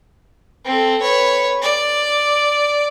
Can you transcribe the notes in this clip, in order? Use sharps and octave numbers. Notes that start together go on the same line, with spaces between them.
C4 A4
B4 C#5
D5